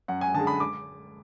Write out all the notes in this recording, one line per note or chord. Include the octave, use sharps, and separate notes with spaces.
F#2 F#5
G#5
D3 G#3 A5
B5
D6